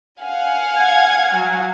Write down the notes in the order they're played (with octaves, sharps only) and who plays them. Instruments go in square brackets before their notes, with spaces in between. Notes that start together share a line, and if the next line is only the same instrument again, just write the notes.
[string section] F5 F#5 G#5
[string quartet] G#6
F#3